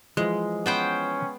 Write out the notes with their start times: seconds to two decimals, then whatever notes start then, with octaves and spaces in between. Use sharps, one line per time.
0.17 E3 F3 G#3
0.66 B3 C#4 C5 G5